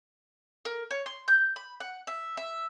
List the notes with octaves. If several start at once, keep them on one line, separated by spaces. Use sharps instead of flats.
A#4
C#5
C6
G6
B5
F#5
E5
E5